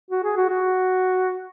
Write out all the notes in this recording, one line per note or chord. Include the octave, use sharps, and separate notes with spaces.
F#4
G#4
F#4
F#4